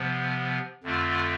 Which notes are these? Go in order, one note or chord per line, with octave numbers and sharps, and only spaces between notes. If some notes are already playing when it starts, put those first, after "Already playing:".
Already playing: C3 F3 B3
F2 D3 A3 C4 F4